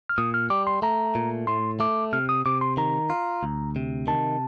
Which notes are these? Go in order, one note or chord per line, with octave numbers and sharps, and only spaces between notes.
F6
A#2 D#6
F6
G3 D6
C6
A3 A#5
A#2
A2 C6
A3 D6
C3 F6
D#6
C3 D6
C6
D#3 A#5
F4
D2
C3
D#3 A5